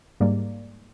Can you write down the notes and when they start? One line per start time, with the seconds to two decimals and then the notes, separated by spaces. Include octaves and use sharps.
0.20 G#2 G3 A#3 D5